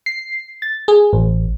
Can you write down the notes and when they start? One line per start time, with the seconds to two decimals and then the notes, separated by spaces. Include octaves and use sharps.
0.06 C7
0.62 A6
0.88 G#4
1.13 A1